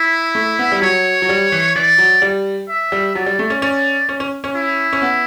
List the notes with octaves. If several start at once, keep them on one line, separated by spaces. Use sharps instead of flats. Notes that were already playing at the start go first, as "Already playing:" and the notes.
Already playing: E4
A3
B3
G3
F#3 C#5
F#3
G3
E3
E3 D5
F#3
G3
E5
G3
F#3 D5
G3
A3
C#4
C#4 D5
C#4
C#4
C#4
E4
C#4
B3